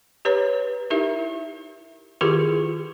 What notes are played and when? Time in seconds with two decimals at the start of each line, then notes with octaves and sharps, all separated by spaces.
0.25 G4 B4 C#5 A#5
0.90 D#4 E4 G4 A#4 E5
2.21 D#3 E4 F4 G4 G#4 A#4